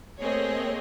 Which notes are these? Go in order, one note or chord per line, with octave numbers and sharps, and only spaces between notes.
A3 A#3 C4 G#4 C#5 D#5